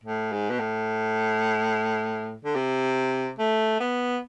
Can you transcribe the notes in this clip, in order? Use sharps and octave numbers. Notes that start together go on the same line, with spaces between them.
A2
G#2
B2
A2
D3
C3
A3
B3